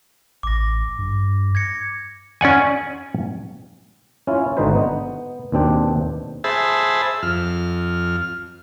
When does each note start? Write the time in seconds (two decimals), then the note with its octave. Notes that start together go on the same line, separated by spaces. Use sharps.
0.43 A1 D6 A#6
0.99 G2
1.55 G#6 A#6 C#7
2.41 C#4 D5 F#5 G#5
4.27 C#4 E4 F4
4.57 G#1 D3 D#4 F#4 B4 C5
4.73 B3
5.52 D#2 B2 C4 D4 G5
6.44 G#4 C5 E5 A5 B5
7.23 F2 F6